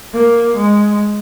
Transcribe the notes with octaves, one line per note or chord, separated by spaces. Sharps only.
A#3
G#3